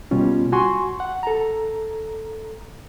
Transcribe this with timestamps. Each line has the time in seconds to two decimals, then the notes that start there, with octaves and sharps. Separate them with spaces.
0.11 B2 G3 A#3 C#4 F4
0.52 F#4 G#5 C6 C#6
1.00 F#5
1.23 A4 A#5